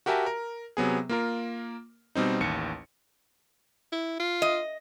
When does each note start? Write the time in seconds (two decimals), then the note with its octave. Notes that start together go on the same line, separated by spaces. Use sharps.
0.06 F#4 G4 A#4 E5 G#5 A5
0.26 A#4
0.77 C3 F#3 B3 G#4
1.09 A#3 F4 A#4
2.15 B2 G3 C4 D#4
2.40 A1 D#2 C#7
3.93 E4
4.20 F4
4.42 D#5